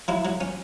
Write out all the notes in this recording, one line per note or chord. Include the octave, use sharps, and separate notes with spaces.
F#3 E4
F#3
C#4